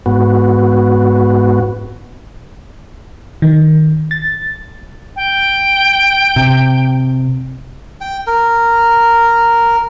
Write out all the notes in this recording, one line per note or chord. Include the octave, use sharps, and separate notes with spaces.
G#2 B3 F#4
D#3
A6
G5
C3
G5
A#4